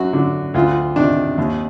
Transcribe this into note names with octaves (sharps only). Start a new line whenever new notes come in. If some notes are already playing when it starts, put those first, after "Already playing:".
Already playing: F#2 F#4
D3
D2 F4
C3 D#3 D4
D#2